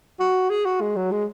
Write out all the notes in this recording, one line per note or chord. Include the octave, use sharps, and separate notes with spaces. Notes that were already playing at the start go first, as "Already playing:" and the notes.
F#4
G#4
F#4
G#3
F#3
G#3